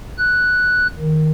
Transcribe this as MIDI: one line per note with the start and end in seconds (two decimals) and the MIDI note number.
0.18 0.87 90
0.99 1.32 51